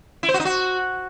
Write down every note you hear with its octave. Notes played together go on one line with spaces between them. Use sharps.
E4
C5
F#4
D#4
F#4